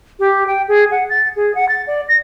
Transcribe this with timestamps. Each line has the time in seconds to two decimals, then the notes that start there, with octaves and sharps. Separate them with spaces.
0.19 G4
0.47 G5
0.68 G#4
0.91 F#5
1.10 A6
1.36 G#4
1.55 F#5
1.69 A6
1.87 D5
2.08 A#6